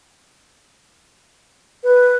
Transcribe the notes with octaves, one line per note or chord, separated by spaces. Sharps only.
B4